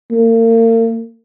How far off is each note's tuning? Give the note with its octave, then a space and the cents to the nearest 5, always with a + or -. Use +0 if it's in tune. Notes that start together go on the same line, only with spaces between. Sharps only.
A#3 -40